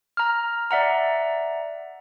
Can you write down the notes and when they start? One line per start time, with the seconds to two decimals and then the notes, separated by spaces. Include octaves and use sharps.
0.17 A#5 F6
0.71 D5 E5 F#5 A#5